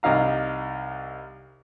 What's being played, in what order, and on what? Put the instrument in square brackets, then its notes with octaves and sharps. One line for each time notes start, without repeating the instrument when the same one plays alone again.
[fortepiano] C2 D#4 F5 A#5